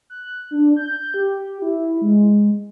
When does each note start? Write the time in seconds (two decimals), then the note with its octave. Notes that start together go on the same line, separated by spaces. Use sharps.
0.10 F#6
0.51 D4
0.77 G6
1.14 G4
1.62 E4
2.01 G#3